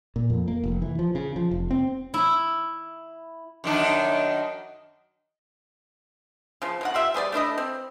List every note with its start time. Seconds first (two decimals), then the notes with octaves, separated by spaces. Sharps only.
0.16 A#2
0.30 F2
0.48 A#3
0.64 F1
0.82 E3
0.99 F3
1.15 C#3
1.36 F3
1.51 F1
1.71 C4
2.14 E4
3.64 F#2 D#3 D4
6.62 C#3 F3
6.81 B2 D#3 F#5
6.94 F4 G4 E5
7.14 G3 G#4 C5 D5
7.32 A3 D4 E4 D#5
7.58 C4